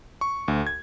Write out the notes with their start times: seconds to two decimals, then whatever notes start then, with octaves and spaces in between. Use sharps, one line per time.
0.21 C#6
0.48 D2
0.67 G#6